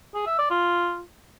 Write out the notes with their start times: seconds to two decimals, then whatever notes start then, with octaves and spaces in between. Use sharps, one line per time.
0.14 G#4
0.26 E5
0.38 D5
0.50 F4